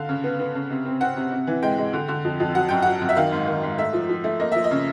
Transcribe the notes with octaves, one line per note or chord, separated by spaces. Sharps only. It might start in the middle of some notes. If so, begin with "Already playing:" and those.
Already playing: D3 F5
C#3
B3
B3
C#3
C3
C4
C4 F#5
C3
C3
E3
G#3 G5
G#3
D3
D3
F2
F2
F#3 F#5
F#2 G5
F#3 F#5
F#2
E5
D#3 F5
G#2
D#3
G#2
A3 E5
F3
F3
A3
A#3 D#5
F3 E5
D#5
C#3